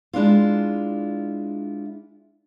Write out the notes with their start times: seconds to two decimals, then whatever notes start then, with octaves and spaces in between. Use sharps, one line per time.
0.13 G#3 D4 E4 F4